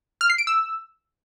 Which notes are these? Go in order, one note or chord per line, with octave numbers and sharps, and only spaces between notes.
F6
C7
D7
E6